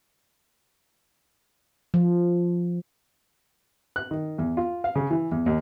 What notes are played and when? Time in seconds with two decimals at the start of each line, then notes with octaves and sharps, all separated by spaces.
1.94 F3
3.96 F#6
4.11 D#3
4.38 E2
4.57 F4
4.84 F5
4.96 C#3
5.11 E3
5.32 E2
5.46 D#2